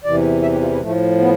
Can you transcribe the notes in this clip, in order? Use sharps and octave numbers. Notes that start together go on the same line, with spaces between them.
E2 C3 E3 D5
E5
G4
F4
E4
A2 F3 A3
B3